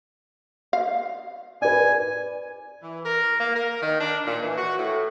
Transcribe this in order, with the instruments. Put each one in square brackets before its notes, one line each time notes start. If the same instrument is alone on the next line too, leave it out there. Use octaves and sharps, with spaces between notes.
[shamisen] F5
[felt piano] B4 D5 [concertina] G#5
[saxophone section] E3
A#4
A#3
A#4
D#3
D4
A#2
E3
F#4
A2